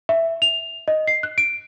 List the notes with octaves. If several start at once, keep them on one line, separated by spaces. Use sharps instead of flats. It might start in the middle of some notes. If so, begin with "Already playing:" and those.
E5
F7
D#5
C7
F#6
D7